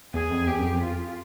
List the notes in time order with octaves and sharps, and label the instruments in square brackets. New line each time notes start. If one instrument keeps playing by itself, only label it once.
[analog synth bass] E2 [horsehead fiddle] G#4
[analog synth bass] F2
[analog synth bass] E2 [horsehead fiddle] G4
[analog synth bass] F#2
F2
[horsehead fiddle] F4